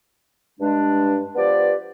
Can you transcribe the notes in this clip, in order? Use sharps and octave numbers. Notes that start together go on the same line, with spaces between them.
G2 G#3 D4
F3 B3 G4 B4 D5